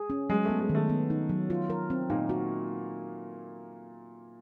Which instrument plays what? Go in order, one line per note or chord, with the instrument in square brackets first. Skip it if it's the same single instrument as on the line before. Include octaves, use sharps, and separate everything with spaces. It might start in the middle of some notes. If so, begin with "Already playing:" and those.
Already playing: [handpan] G#4
C#4
[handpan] F#3 [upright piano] G#3
[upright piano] A3 [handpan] B3
[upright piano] G#3
[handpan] D#3
[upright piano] A3
[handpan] B3
D#4
F#3
F4
A#4
C4
[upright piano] A#2 A#3 [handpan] D#4
[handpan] F#4